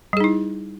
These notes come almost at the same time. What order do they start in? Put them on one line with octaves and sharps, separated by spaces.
G3 G#4 D#4 E4